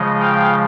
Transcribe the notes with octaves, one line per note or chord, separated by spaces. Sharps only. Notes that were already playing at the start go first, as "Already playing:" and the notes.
Already playing: C#3 F3 G#3 D#5
F5 G5